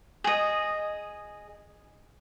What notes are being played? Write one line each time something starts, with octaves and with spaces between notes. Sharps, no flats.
G#4 D#5